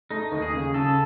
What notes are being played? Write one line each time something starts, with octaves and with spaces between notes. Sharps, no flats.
A3 D#4
D#2
G#4
C#3
C#3 A4